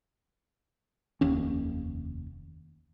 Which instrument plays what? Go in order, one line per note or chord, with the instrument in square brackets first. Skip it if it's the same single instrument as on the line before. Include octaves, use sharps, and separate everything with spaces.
[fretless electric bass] F1 D#2 C#4